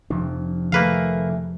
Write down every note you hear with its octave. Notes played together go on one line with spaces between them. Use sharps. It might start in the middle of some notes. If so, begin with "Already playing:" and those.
F1 C3 D4
C3 D#3 F3 A3 A#3 G#4 B4 F5